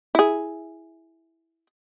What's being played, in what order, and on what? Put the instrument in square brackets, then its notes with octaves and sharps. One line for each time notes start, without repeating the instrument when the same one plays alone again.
[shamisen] E4 G#4